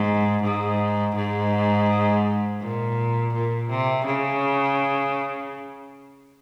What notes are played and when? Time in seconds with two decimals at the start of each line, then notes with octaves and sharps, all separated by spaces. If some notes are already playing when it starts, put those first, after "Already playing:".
Already playing: G#2
0.43 G#2
1.16 G#2
2.60 A#2
3.34 A#2
3.70 C3
4.06 C#3